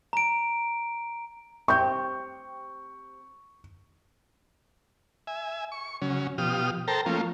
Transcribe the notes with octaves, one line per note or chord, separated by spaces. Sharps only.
A#5 D7
C4 G4 C#6 G6
E5 G#5
C#6
C#3 F#3 C#4
B2 F3 G4 D#6 F6
A4 A#4 C5 G5 A5 A#5
F3 A3 A#3 C#4 F4